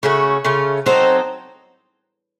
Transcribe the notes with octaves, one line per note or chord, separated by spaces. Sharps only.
C#3 A3 C#4 F#4 C#5
C#3 A3 C#4 F4
F#3 C4 D#4 A4 C5